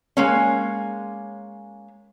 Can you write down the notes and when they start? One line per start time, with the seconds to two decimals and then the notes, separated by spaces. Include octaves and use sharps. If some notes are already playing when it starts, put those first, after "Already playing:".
0.17 G#3 A#3 C#4